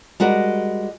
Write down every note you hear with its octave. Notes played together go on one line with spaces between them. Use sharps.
G3 G#3 F#4 A#4